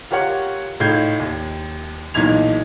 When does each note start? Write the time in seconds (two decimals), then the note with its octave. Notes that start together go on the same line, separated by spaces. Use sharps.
0.11 F4 G4 A#4 C#5 F#5
0.80 A2 D#4 F4 G6 G#6 C7
1.19 D#2
2.14 B1 A#2 E3 D#4 G#6 F7